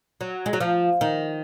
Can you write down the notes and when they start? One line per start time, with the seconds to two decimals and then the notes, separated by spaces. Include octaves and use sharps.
0.21 F#3
0.46 G#3
0.53 F#3
0.61 F3
1.01 D#3